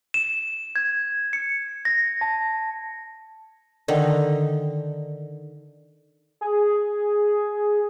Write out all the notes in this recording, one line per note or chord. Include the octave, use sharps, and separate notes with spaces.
E7
G#6
C#7
A#6
A5
D3 D#3 D#4
G#4